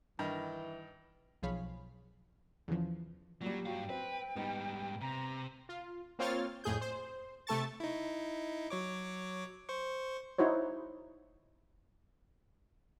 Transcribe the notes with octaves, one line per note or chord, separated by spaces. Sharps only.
G2 D#3 E3
B1 F3 G#4 C#5 F5 B5
E2 C#3 E3 F3
A#2 F#3 G3
G2 F#3 F5 G5
C4 B4
G#2 G3 B3 D#4
C3 A#5
F4
A#3 C4 F4 C#5 F6 A6
F2 A2 G#4 G6
C5
C3 A3 A4 A5 C#6 A6
D#4 E4
F#3 C#5 D6
C5 C#6
D#4 E4 F#4 C5 C#5